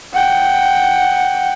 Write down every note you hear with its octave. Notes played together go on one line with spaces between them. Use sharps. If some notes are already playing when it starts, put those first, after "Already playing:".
F#5 G5